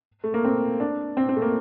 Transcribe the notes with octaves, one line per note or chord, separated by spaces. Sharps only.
A3
A#3
C4
D4
C4
C4
A3
A#3